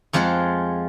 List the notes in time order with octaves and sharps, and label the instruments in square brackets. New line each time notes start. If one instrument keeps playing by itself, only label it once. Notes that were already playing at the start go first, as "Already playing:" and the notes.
[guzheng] F2 F3 G#3 F4 F#5